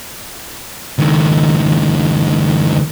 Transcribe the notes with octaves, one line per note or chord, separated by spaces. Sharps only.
C#2 D#3